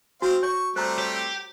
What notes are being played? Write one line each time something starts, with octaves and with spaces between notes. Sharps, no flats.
C4 F#4 C5 F5
C#5 C#6
G3 A3 C4 C5 A#5
G4 C#5